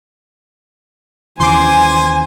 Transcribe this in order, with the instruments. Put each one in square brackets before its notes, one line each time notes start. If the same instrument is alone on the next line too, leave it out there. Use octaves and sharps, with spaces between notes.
[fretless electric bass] D#2 C#3 E3 [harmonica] C5 [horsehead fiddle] G#5 [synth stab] C6 D6